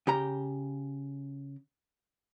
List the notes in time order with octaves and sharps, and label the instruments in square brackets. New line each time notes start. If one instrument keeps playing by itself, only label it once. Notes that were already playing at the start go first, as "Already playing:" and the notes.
[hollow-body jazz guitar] C#3 G4 A#5